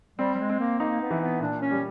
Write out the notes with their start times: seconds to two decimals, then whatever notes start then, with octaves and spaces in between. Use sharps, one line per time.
0.18 G3 C4
0.34 G3
0.39 G#3
0.50 C4
0.59 A#3
0.80 A#3 D#4
1.00 B3
1.11 E3
1.21 B3
1.40 A#2 D4
1.61 C#4
1.71 G3